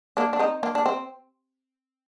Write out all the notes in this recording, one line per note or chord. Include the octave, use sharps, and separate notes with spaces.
A#3 D4
D4
C4 D#4
A#3 D4
D4
C4